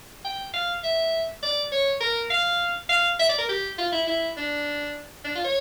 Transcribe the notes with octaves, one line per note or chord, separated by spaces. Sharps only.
G5
F5
E5
D5
C#5
A#4
F5
F5
E5
D5
A#4
G4
F4
E4
E4
D4
D4
F4
C#5